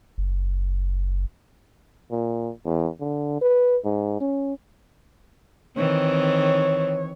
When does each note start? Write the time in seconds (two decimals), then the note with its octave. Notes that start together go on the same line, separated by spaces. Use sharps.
0.18 F#1
2.11 A#2
2.65 E2
3.00 D3
3.41 B4
3.84 G#2
4.20 C#4
5.77 D#3 E3 C4 C#5